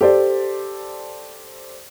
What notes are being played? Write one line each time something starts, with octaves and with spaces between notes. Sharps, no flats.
G4 A4 C5 D5